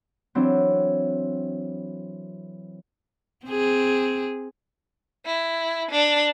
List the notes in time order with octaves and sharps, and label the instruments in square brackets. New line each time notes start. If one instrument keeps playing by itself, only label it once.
[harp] E3 F#3 C4 D4
[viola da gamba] C4 G#4
[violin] E4
D4